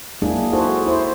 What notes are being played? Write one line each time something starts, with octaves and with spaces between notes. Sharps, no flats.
F#3 G#3 A#3 D4 E4 G#4
D#4 E4 F#4 G#4 A4 C5
E4 C5